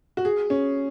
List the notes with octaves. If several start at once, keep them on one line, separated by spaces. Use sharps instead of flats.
F#4
G#4
C#4